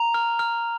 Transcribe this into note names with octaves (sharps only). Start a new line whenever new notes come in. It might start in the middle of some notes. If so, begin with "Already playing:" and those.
Already playing: A#5 F7
F6
F6